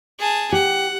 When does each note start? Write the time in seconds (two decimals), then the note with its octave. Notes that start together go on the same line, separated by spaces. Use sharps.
0.19 G#4 A5
0.52 G4 F#5